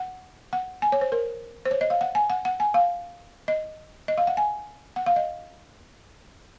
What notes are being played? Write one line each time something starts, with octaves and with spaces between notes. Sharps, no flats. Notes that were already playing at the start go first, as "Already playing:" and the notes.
Already playing: F#5
F#5
G#5
C#5
C5
A#4
C5
C#5
D#5
F5
F#5
G#5
F#5
F#5
G#5
F5
D#5
D#5
F5
F#5
G#5
F#5
F5
D#5